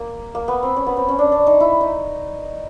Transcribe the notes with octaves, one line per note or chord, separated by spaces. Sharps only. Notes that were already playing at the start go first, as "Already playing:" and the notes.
Already playing: A#3
A#3
B3
C4
C#4
B3
C4
C#4
D4
D4
D#4
E4
D#4